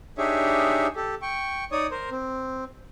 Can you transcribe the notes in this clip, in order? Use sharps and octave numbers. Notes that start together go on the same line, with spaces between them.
D4 D#4 G4 G#4 C#5 E5
G4 A4
G5 C#6
D#4 C#5 D5 D#6
A#4 C5
C4